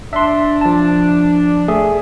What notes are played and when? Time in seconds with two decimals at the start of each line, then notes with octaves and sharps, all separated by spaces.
0.13 D4 E5 C6
0.61 F3 A5
1.68 A3 G#4 E5